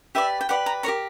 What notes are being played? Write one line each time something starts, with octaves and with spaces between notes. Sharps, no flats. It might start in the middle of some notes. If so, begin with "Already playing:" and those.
G4 B4 D5 E5
G5
G4 B4 D5 F#5
A#5
G4 A#4 C#5 A#5